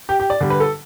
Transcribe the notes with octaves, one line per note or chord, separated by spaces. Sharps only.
G4
G4
D5
D3 G3
B4
A4